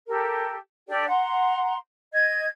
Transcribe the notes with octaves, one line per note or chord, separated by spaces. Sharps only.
G4 A4 A#4
D4 G4 A4 D5
F#5 A#5 C6
D#5 G#6